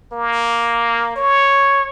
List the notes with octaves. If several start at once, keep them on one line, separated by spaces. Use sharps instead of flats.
A#3
C#5